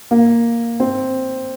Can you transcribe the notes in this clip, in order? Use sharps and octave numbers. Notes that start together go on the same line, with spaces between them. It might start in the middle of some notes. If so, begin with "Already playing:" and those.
A#3
C4